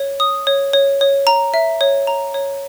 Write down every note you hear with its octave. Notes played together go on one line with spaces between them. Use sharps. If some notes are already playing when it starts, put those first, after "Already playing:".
Already playing: C#5
D#6
C#5
C#5
C#5
A#5
E5
C#5
A#5
C#5